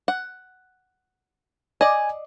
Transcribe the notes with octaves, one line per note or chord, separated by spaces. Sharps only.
F#5
D5 D#5 G#5